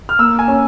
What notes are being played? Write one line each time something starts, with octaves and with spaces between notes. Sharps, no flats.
F6
A#3 E6
G#5
C#4